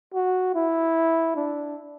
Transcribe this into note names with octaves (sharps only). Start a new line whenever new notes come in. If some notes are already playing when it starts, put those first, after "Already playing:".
F#4
E4
D4